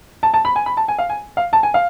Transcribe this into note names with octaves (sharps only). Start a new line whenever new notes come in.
A5
A5
B5
G#5
B5
A5
G#5
F5
G#5
F5
A5
G#5
F5